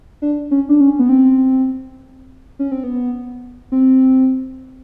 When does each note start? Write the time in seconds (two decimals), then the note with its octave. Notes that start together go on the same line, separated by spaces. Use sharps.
0.22 D4
0.51 C#4
0.69 D4
0.81 C#4
0.99 B3
1.09 C4
2.59 C#4
2.72 C4
2.84 B3
3.72 C4